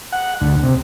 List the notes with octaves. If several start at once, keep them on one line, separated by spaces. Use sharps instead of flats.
F#5
D2
C3